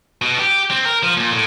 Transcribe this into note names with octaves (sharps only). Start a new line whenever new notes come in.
B2
G4
C4
A#4
F3
A#2
A2